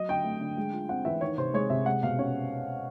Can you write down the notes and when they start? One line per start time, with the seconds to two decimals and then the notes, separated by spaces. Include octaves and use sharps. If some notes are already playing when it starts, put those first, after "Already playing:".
Already playing: F#3 D#5
0.09 D3 G5
0.24 A3
0.41 D3
0.57 G#3
0.73 F4
0.89 C4 F#5
1.05 E3 E5
1.21 D#3 C#5
1.38 C3 C5
1.54 G#3 C#5
1.70 C3 E5
1.86 G#3 F#5
2.03 B2 F5
2.18 C#4 C#5